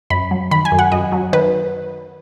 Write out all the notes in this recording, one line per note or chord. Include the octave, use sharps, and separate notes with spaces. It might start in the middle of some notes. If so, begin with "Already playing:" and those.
F#2 B5
F#3
D#3 B5
G#5
F#2
F#5
F#2 D#5
F#3
D#3 B4